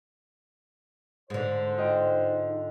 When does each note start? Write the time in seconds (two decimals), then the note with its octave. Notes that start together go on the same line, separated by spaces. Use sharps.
1.30 G#2 D3 C5
1.77 F4 D#5 G5